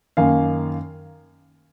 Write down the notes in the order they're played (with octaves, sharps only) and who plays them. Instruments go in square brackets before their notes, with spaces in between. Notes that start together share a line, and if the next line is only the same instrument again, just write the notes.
[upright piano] F#2 D#3 A#3 F5 G#5